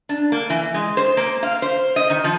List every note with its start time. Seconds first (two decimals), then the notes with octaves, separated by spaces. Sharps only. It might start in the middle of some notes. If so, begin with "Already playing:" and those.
0.09 D4
0.32 A#3
0.50 E3
0.74 G#3
0.97 C5
1.17 A#3
1.43 F5
1.62 C5
1.96 D#5
2.10 D#3
2.24 F3